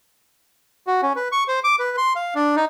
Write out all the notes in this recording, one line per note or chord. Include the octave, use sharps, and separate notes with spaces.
F#4
C#4
B4
C#6
C5
D6
B4
C6
F5
D4
D#4